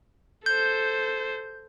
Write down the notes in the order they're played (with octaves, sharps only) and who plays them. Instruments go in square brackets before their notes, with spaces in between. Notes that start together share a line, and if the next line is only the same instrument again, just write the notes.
[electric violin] A4 C5 [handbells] G6